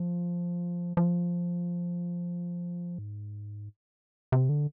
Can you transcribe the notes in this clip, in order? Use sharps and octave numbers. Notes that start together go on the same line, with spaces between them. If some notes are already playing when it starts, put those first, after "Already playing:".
Already playing: F3
F3
G#2
C3
D3